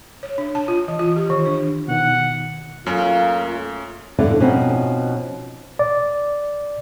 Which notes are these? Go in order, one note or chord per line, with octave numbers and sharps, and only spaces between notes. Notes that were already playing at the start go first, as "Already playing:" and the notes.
C#5
D4
A5
F4
E3
F4
G4
D#3
D4
B2 D#3 F#5
F#2 A3 A#3 C#4 F4
F2 A2 D3 E3 G3 D4
B2 F3 C4 C#4 D#4
D5